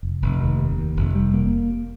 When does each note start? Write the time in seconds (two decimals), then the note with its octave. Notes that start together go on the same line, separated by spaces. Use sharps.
0.03 F1
0.22 F1
0.39 D#2
0.59 D#2
0.78 D#2
0.96 F1
1.15 G3
1.34 A#3